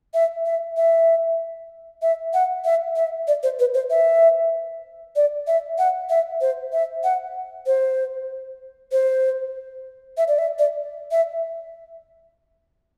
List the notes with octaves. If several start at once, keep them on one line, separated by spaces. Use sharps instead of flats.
E5
E5
E5
E5
F#5
E5
E5
D5
C5
B4
C5
E5
D5
E5
F#5
E5
C5
E5
F#5
C5
C5
E5
D5
E5
D5
E5